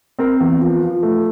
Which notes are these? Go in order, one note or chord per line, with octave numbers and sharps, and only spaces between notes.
C4 A#4
E2
F3
F3
A3